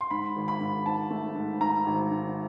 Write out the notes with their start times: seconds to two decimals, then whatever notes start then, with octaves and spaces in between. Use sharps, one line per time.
0.01 C6
0.10 G#2 B5
0.36 G#1
0.48 B5
0.61 G#2
0.86 G#2 A5
1.11 A3
1.36 G#2
1.61 G#2 A#5
1.86 G#1
2.11 G#2